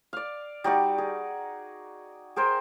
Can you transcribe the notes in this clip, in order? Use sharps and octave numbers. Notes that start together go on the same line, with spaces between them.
D5 F5
G3 D#4 F#4 D5
G#4
G#4 A#4 C5 G5